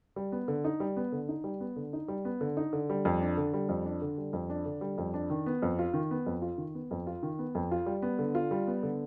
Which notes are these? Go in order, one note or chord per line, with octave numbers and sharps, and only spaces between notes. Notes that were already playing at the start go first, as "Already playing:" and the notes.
G3
B3
D3
D#4
G3
B3
D3
D#4
G3
B3
D3
D#4
G3
B3
D3
D#4
D3
G3
F2
D4
D3
G3
F2
D4
D3
G3
F2
D4
D3
G3
F2
D4
D#3
B3
F2
F4
D#3
B3
F2
F4
D#3
B3
F2
F4
D#3
B3
F2
F4
G3
B3
D3
F4
G3
B3
D3